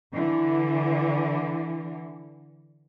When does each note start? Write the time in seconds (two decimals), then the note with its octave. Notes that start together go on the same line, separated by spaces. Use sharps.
0.13 D3 E3